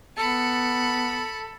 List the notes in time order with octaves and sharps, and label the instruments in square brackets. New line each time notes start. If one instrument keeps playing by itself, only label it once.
[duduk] B3 [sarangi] A4 [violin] B5 C#7